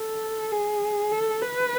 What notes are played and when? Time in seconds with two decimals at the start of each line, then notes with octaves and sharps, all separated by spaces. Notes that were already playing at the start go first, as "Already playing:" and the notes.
Already playing: A4
0.51 G#4
1.12 A4
1.42 B4